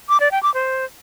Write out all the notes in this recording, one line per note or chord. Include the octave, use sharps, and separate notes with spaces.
D6
D5
G5
D6
C5